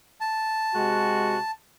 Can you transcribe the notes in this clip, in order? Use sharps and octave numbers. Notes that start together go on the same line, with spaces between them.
A5
C3 G#3 F#4